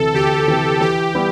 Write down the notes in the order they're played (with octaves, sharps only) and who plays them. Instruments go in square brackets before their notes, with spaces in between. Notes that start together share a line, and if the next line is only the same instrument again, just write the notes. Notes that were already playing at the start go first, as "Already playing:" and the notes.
Already playing: [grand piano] D2 C3 E3 [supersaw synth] A4
[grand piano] D2 [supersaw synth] G4
[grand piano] C3 E3
[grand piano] E3 [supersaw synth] G4
[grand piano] G3 B3 E4